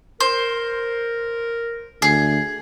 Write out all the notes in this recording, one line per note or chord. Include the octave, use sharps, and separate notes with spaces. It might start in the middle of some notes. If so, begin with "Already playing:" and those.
A#4 C5
D2 G#4